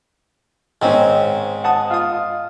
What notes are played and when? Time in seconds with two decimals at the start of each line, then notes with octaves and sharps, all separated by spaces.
0.82 G#2 D#3 C4 C#4
1.64 F#5 A5 D#6
1.90 F4 D#6